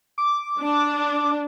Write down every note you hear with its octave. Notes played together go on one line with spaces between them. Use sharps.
D6
D4